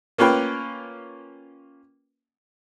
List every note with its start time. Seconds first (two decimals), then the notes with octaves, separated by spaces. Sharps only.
0.18 A#3 C#4 F4 B4 G5